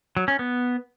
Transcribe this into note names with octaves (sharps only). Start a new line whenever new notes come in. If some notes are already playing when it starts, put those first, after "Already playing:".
F#3
C#4
B3